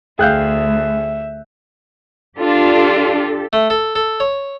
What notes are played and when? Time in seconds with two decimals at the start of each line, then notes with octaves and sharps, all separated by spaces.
0.19 D2 G#4 E5 F5 G5 F#6 G6
2.39 D4 F4 G4 A4
3.53 A3
3.70 A4
3.95 A4
4.20 C#5